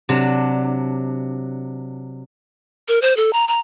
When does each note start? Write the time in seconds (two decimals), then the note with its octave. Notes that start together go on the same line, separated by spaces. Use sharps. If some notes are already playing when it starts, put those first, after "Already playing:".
0.09 C3 F#3 D4
2.88 A#4
3.02 C5
3.17 A4
3.33 A#5
3.48 A#5